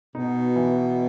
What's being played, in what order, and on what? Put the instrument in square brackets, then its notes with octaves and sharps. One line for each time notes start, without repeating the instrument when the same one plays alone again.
[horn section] B2 [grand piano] D#4
[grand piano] E3